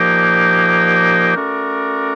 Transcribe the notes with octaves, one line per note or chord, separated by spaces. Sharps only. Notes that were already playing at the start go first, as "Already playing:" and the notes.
Already playing: A#2 F3 A#3 D#4 G4
A3 C#4 F#4 A#4 D5